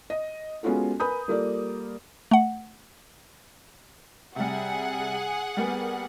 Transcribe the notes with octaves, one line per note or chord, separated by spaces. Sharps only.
D#5
G#3 B3 C#4 F4 F#4 A4
A#4 B4 G#5 B5 D#6 G6
G3 A#3 F4 A4 A#4 D5
A3 F#5
C3 G3 G#4 F#5
G3 A#3 B3